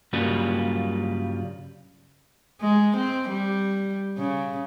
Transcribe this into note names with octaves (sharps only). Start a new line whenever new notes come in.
G2 C#3 F#3 G3 A#3 F4
G#3
C4
G3
C#3